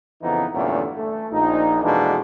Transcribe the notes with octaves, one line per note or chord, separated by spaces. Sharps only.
F2 C#3 E3 B3 D#4
E2 G2 A#2 D3 A3 C#4
A3
A#1 D#4
F2 B2 E3 G#3 A#3 D4